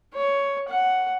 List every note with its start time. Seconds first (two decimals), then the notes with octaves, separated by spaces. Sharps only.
0.14 C#5
0.69 F#5